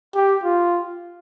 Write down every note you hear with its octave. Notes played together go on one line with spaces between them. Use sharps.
G4
F4